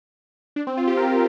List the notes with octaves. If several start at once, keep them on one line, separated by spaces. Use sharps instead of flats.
D4
C4
F4
G4
A#4